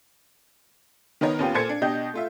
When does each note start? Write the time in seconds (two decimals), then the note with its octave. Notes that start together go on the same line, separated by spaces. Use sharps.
1.21 D#3 B3 D#4 A#4 C#5
1.39 D#2 B3 C#4 F4 G4
1.54 A#2 A4 C5 G#6 C#7
1.69 D4
1.81 B2 D4 G4 D#5 G6
2.14 A3 F4 E5